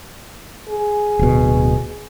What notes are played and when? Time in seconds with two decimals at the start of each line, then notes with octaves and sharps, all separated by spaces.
0.68 G#4
1.19 D1 B2